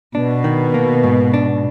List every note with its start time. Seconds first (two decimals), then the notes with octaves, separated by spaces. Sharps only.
0.15 B2 D4
0.44 D#3
0.74 A#3
1.04 G#2
1.34 D4